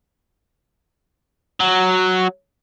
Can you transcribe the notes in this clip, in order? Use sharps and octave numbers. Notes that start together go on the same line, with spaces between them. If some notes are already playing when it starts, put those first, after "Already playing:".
F#3